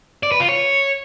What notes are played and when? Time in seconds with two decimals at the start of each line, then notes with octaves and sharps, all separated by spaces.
0.23 D5
0.32 B4
0.40 F4
0.49 C#5